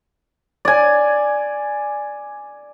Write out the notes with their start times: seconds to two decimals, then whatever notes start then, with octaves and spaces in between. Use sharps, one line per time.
0.65 D5 G#5